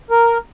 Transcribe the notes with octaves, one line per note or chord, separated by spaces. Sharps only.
A#4